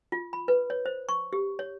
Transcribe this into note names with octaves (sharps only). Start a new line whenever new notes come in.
F4
B5
B4
C#5
C5
C#6
G4
C#5